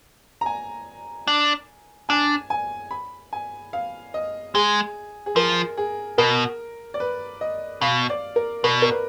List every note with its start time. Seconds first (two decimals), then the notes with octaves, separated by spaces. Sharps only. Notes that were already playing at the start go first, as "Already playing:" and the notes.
0.41 A#5
0.46 G#5
1.28 D4
2.09 D4 G#5
2.50 G#5
2.91 B5
3.33 G#5
3.73 F5
4.14 D#5
4.55 G#3 G#4
5.26 G#4
5.36 F3 A#4
5.78 G#4
6.18 B2 A#4
6.94 D5
7.00 B4
7.41 D#5
7.81 B2 F5
8.10 D5
8.36 A#4
8.64 B2 A#4
8.82 A#4
8.91 B4